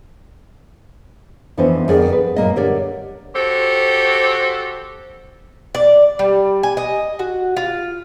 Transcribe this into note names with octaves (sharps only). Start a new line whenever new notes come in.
F2 E3 B3 C#4 D4 C5
F2 D3 G#4 A#4 D5 G5
B4
F#2 A#2 A#3 D#5
D3 G4 A#4 C#5 D5
F#4 G4 A4 C5
D5
G3
G#5
D#5
F#4
F4